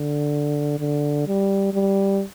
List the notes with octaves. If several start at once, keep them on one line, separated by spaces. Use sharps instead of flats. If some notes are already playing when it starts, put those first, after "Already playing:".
Already playing: D3
D3
G3
G3